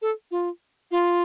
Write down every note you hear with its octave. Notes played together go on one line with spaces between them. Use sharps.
A4
F4
F4